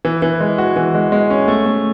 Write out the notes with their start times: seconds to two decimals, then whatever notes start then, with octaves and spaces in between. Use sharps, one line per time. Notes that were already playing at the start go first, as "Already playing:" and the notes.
0.05 E3
0.22 E3
0.41 G#3
0.58 F#4
0.76 E3
0.95 G#3
1.12 G#3
1.30 C#4
1.48 A3
1.66 A3